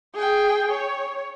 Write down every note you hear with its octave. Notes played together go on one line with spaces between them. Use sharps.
G#4 G5
C#5